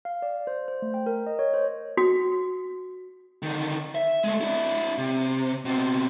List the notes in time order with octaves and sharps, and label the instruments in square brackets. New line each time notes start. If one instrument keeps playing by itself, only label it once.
[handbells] F5
D5
C5
C5
A3
G5
A#4
D#5
C#5
C5
[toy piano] F#4
[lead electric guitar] D3 D#3
E5
G#3 A3
D4 E4
C3
B2 C4